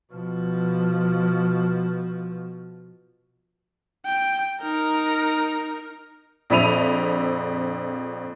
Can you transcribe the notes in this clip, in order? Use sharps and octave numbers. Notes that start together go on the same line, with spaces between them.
B2 F3
G5
D#4 A#4
A#1 F2 E5 B5 D#7 F7